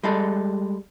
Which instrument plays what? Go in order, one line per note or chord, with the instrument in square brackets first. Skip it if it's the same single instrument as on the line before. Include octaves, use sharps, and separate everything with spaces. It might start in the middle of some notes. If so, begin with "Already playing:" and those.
[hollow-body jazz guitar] G3 G#3 A4